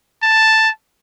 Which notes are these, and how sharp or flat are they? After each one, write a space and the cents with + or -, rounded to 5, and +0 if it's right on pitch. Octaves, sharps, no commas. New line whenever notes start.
A5 +5